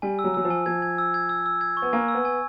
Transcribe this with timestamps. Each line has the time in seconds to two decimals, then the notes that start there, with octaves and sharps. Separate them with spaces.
0.02 G3 G#5
0.19 E6
0.24 F#3
0.34 F#3 E6
0.45 F3
0.50 G#5
0.66 F3 G#6
0.82 G#6
0.98 E6
1.14 G#6
1.29 E6
1.46 E6
1.61 G#6
1.77 C#6
1.82 B3
1.93 A#3 G#5
2.08 E6
2.15 B3
2.25 G#5